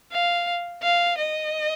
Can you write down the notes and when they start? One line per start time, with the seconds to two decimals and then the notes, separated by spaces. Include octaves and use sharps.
0.11 F5
0.82 F5
1.17 D#5